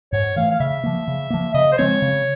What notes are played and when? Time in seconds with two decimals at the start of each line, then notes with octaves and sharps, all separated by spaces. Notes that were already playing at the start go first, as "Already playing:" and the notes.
0.12 G#2 C#5
0.36 E3 A3 F5
0.51 F5
0.60 C#3 E5
0.84 F3 A#3
1.08 C#3
1.30 F3 A#3
1.54 C#3 D#5
1.72 C5
1.78 F3 G#3 C4 C#5
2.02 C#3